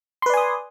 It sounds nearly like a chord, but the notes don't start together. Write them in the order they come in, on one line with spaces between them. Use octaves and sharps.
C6 B4 D5 G#5 D#6